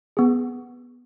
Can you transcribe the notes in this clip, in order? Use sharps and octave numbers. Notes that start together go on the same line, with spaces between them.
B3 G#4